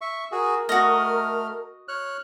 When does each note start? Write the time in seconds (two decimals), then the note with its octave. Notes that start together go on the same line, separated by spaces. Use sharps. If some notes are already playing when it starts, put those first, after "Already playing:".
0.01 E5 C#6
0.32 F#4 G#4 A#4
0.69 A3 F#4 D#5 F6
1.88 C#5 F6 F#6